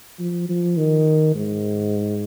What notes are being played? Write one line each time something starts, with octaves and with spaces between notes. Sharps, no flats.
F3
F3
D#3
G#2